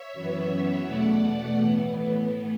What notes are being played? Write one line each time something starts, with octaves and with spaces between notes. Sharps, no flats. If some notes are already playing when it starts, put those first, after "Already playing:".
Already playing: C#5 E5
F#2 E3 B3
E2 B2 A3 D5 F#5
A2 E3 B3